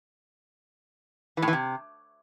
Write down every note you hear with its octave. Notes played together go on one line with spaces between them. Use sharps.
E3
A2
E3
C3